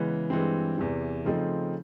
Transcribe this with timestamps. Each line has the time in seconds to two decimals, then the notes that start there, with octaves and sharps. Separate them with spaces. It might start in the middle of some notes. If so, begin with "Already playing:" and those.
Already playing: C#3 E3 G#3 B3
0.30 G2 E3 G#3 C4
0.78 E2 C3 E3
1.25 C#3 F3 A3 C4 D#4